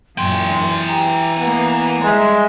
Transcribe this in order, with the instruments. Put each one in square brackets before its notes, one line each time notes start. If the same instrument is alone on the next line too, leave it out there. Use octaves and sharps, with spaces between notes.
[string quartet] F#2 A#2 [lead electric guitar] E3 G5 [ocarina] C6
[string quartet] G4 [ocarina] A#5
[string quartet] A#3 B3
[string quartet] G3 E5 [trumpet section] G#3